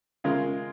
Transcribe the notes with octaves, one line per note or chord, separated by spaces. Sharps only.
C#3 G#3 F4 A#4